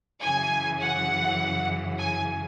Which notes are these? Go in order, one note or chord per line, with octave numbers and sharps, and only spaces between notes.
F#2 C#3 E3 G#5
F#5
G#5